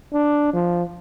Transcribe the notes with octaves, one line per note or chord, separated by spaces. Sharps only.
D4
F3